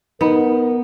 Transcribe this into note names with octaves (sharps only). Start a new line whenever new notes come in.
B3 D#4 A#4